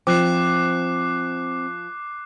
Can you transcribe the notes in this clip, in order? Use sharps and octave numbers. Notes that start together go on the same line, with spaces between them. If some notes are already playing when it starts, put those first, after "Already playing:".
F3 C4 D6 F#6 C7